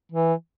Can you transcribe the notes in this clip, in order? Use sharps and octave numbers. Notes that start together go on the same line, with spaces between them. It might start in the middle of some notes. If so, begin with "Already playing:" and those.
E3